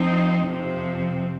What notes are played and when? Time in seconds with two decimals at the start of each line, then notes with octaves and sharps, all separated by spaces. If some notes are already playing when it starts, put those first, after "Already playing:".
Already playing: F3 C4 D#4
0.46 F2 C3 F3 C4